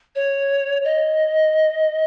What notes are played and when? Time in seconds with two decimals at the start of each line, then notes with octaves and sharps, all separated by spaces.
0.16 C#5
0.85 D#5